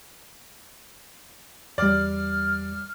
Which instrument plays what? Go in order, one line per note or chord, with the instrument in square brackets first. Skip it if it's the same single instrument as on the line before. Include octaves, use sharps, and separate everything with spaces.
[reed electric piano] E2 G3 [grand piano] D5 [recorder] F6